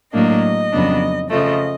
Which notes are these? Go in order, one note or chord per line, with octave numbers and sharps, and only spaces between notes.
A2 F#3 A#3 D4 D#5
F2 C#3 F#3 B3 D4
C#3 F3 A3 D#5